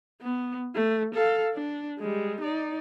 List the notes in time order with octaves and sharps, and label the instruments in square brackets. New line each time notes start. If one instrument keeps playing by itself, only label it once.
[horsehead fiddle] B3
A3
A4 F5
D4
G3 G#3
D#4 D5